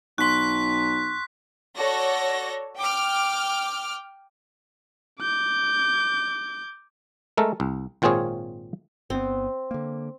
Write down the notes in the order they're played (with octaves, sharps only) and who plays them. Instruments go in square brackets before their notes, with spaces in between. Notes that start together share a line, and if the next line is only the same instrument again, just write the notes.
[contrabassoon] B1 [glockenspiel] C6 C#6 [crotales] F#6 B6
[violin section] F#4 A4 C#5 D5 A#6
G5 D6 F6
[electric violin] D6 G6
[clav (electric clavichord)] G#3 A3 A4 A#4
C2
G#1 A#2 C4 F4 G#4 C#5
[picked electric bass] G1 B3 [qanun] C4
[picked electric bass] D3 A#3